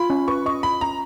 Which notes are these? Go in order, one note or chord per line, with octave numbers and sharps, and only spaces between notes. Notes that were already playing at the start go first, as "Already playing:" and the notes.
Already playing: F4 B5
C#4
B4 C#6
D#5 C#6
F4 B5
C#4 A#5